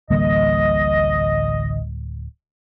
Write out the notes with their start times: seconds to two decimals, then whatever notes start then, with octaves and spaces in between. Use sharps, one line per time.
0.10 D1 A1 D3 E3 G3 A#3 D#5